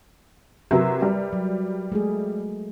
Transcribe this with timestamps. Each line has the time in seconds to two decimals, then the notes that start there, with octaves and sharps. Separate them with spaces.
0.71 C3 F#3 A#4 B4 E5
1.02 G3
1.33 F#3
1.92 G#3 A3 G#4